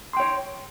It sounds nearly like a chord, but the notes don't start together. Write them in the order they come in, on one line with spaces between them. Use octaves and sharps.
C6 G5 C#5